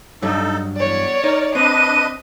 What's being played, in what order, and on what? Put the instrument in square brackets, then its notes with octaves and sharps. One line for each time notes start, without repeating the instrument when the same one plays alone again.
[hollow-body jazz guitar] G2 F#3 [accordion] D#4 A4
[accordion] E2 [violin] C#5 D5
[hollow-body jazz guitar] D#4 [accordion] A#4
[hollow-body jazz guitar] C4 [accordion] D4 B4 D#5 [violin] D#7